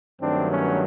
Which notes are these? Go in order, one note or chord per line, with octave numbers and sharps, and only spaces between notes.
G2 D#3 F#3 A3 C4 D4
B3 C#4